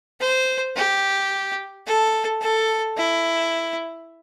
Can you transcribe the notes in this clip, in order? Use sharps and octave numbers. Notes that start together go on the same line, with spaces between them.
C5
G4
A4
A4
E4